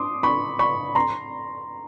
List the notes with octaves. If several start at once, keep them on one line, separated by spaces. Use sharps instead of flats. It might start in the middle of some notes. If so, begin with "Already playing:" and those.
Already playing: C6 D6 D#6
B5 C#6
B5 C#6
A#5 C6